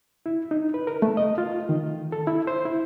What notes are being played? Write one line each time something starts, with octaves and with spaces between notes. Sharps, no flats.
E4
D#4
B4
A#4
A3
D#5
F4
D#3
A4
E4
C5
E4